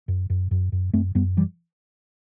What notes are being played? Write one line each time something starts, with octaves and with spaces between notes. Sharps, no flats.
F#2
F#2
F#2
F#2
F#2 A3 C4
F#2 G3 B3
E3 G3